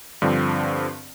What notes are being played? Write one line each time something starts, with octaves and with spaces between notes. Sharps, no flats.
G2 D3 F3 C4